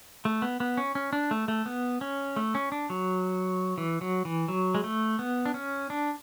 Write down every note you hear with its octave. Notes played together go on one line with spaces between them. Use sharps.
A3
B3
B3
C#4
C#4
D4
A3
A3
B3
C#4
A3
C#4
D4
F#3
E3
F#3
E3
F#3
G#3
A3
B3
D4
C#4
D4